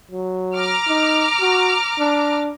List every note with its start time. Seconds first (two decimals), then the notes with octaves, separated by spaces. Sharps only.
0.11 F#3
0.54 A#5 D6 F6
0.88 D#4
1.40 F#4
1.99 D4